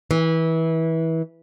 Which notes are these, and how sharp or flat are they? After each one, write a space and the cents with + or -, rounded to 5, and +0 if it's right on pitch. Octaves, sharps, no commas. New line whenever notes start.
E3 -25